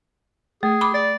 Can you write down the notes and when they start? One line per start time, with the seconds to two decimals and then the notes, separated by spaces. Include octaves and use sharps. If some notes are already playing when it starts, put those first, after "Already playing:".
0.63 A3 G#4
0.81 B5 D6 D#6
0.94 D5